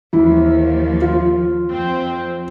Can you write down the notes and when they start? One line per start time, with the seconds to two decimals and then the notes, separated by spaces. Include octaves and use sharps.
0.13 D#2 E3 F3 E4
1.02 F4
1.70 F2 C4